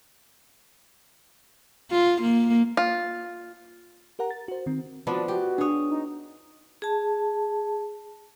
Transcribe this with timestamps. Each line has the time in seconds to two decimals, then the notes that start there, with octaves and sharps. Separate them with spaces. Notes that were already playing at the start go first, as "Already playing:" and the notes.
1.91 F4
2.22 A#3
2.77 F4
4.19 G4 A#4 F#5 A#5
4.31 A6
4.48 F#4 C5
4.66 D#3 C4
5.07 F3 B3 D4 F#4 B4 D5
5.28 F#4 G4
5.58 D4 G#4 C#5 D#6
5.88 D#4
6.82 G#4 A5